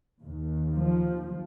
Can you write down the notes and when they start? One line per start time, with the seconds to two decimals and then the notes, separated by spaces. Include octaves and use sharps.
0.21 D#2
0.75 F3